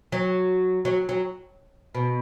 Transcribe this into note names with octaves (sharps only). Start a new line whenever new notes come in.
F#3
F#3
F#3
B2